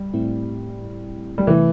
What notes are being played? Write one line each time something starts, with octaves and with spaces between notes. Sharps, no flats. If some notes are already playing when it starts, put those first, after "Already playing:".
Already playing: G3
A2 A3 C4 E4
G3
C3 E3 A3 E4